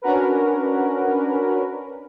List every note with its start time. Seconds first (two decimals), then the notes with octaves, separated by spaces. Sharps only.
0.02 C#4 D4 F#4 A#4 B4